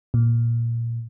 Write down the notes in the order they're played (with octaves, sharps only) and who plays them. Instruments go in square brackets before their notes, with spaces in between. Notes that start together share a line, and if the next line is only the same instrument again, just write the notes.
[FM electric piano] A#2